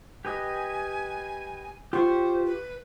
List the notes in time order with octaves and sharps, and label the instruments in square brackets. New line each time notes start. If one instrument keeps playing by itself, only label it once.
[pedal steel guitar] G4 B4 D#5 [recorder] G#5
[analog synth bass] F4 [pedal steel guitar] G4 C#6 [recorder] C5
[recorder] B4